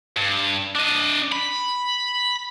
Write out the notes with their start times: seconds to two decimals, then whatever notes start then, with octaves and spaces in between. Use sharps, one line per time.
0.17 G2
0.75 D4 D#5
1.32 B5